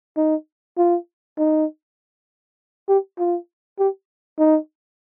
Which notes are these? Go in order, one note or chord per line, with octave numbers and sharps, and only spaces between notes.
D#4
F4
D#4
G4
F4
G4
D#4